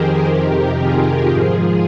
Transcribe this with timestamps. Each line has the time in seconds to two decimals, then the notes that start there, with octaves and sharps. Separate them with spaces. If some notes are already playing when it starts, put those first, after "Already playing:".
Already playing: F2 D#3 G4 G#4 A#4 C5
0.31 F2 C3 D#3
0.80 F4 G#4
1.30 G#2 F3